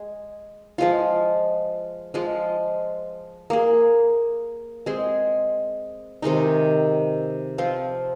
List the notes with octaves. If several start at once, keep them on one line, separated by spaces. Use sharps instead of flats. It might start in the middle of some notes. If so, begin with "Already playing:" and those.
Already playing: G#3 G#4
F3 G#3 F4
F3 G#3 F4
A#3 G#4
G#3 C4 G#4
C3 D#3 G#3 D#4
F3 C4 F4